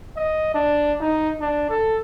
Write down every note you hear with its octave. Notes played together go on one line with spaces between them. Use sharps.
D#5
D4
D#4
D4
A4